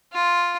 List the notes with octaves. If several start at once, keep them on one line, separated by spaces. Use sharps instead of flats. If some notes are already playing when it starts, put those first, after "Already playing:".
F4